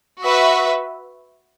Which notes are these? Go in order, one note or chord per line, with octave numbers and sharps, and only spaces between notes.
F#4 B4 E5